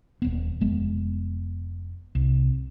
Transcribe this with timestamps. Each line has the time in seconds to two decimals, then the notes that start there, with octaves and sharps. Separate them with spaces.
0.22 D#1 B3
0.61 F1 G#3 B3
2.15 C2